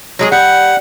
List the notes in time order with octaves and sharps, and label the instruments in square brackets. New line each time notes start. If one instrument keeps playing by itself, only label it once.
[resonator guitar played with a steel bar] F#3 G#3 G#4
[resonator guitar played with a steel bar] G3 [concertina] F#5